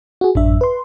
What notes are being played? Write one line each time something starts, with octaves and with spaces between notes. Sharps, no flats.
F#4 G#4
A1 F#2 D4 E5
B4 C6